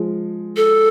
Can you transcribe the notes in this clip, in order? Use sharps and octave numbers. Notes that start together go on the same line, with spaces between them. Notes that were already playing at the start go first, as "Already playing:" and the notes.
Already playing: F3 G#3
A4